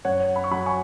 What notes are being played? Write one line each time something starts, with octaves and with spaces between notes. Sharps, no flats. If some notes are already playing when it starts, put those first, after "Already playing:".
F#2 C#5 F#5
B5
C#6
F#3 F#5 B5
G#5 C#6